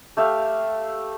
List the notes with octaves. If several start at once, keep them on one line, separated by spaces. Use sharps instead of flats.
A3 G4 E5 F5